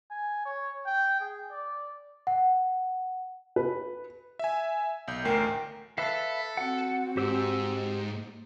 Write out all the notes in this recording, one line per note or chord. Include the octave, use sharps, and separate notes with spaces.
G#5
C#5
G5
G#4
D5
F#5
B4
E5 G#5
B1 G6
A1 D2 A#4 G5 C7
A4 B4 E5 F5
C4 F#4 F#5
G#2 G4 C5 E6